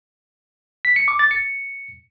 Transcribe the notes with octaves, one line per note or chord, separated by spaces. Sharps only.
B6
C#7
D6
A6
C#7